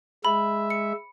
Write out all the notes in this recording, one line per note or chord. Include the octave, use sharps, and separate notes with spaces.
G#3 E5 B5
C#7